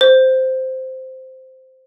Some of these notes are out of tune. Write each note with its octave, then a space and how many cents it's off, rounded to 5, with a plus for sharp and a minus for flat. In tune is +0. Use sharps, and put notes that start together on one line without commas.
C5 -5